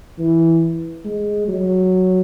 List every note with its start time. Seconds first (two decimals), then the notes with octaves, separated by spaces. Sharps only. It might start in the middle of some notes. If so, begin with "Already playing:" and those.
0.19 E3
1.05 G#3
1.48 F#3